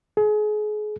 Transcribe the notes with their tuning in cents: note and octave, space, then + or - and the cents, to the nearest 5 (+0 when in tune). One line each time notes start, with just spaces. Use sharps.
G#4 +30